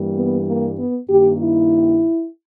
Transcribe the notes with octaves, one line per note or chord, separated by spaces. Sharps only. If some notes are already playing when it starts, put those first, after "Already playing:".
Already playing: G2 E3 G3 A#3
B3
A#3
B3
G2 D#3 A#3 G4
E4